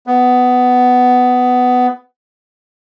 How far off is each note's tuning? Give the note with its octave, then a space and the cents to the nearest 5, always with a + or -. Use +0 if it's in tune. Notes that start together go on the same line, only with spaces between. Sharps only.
B3 +15